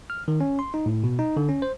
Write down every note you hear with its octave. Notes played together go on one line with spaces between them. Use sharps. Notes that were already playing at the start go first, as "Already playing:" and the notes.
F6
D#3
C#4
C6
D#4
A2
B2
D#4
D3
C#4
C5